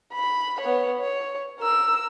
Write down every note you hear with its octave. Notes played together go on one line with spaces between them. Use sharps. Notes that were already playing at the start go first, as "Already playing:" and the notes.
B5
B3 C#5
C#5
A#4 E6